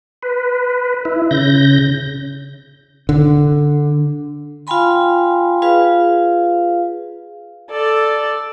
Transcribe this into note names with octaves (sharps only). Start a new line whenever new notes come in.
B4
E4
C#3 G6 A#6
D3
F4 F5 G5 G#5 B5 C6
F4 G#4 B4 F5
A4 D5